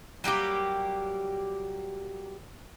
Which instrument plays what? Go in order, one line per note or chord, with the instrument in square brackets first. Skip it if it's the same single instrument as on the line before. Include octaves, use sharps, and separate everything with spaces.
[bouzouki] F#3 G3 A#3 G4